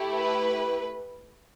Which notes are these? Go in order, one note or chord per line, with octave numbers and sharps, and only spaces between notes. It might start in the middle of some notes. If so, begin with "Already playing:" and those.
Already playing: A3 E4 G4
B4